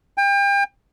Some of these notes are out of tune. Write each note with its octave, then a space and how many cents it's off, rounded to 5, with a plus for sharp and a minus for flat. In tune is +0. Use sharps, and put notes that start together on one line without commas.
G5 +35